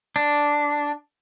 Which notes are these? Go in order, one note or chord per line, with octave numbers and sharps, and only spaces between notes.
D4